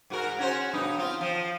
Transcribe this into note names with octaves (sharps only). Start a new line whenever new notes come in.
G#2 F#4 A#4
C#4 F#4 C5
G2 B2 D#4
C4 F4
F3